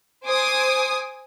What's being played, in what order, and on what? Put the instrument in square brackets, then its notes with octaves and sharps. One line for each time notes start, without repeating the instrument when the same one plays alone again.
[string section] C5 G#5 D6 D#6